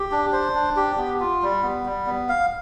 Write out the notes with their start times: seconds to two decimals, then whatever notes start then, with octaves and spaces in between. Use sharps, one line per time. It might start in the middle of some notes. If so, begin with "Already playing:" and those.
Already playing: G4
0.11 D4
0.32 C5
0.55 D4
0.76 G4
0.98 B3
1.20 F4
1.42 G3
1.63 B3
1.85 G3
2.06 B3
2.29 F5